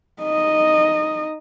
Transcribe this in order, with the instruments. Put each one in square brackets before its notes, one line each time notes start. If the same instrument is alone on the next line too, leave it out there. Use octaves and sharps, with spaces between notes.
[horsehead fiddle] D#4 D#5